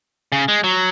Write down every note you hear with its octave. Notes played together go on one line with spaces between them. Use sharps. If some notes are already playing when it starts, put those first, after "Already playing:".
C#3
G#3
F#3